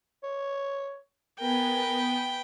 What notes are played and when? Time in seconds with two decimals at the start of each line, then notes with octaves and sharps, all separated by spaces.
0.23 C#5
1.40 B3 A#4 B4 G5 G#5